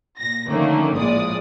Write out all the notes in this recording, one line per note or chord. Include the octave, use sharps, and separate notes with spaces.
A#2 A#6
D3 D#3 F3 A3 A#3 C#4
A#1 A2 G#3 D5 D#6